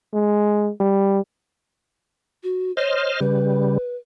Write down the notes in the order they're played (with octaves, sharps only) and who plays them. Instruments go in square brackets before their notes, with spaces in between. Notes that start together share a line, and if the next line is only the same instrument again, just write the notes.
[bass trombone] G#3
G3
[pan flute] F#4
[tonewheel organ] C5 D#5 F6 [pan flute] C#5
[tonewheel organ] C#3 G3 [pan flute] B4